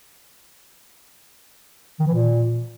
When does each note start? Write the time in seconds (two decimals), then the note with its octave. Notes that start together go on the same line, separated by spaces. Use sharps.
2.00 D#3
2.07 E3
2.14 A#2